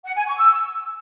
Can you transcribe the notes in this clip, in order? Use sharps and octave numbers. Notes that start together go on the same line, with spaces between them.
F#5
G#5
C#6
E6